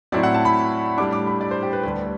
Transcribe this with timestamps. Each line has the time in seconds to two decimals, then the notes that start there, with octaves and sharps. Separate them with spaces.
0.12 A2 F#3 C4 E4 D5
0.23 F#5
0.34 A5
0.45 B5
0.98 A2 G3 D4 D6
1.13 D6
1.27 B5
1.41 D5
1.51 C5
1.63 G4
1.73 B4
1.83 D2 D3 G3 B4